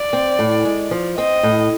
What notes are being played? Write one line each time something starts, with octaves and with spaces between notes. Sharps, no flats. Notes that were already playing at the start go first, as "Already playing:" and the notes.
Already playing: D5
C4
A2
G#3
F3
C4 D#5
A2